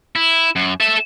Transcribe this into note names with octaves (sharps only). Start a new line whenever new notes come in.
E4
F#2
A4 E5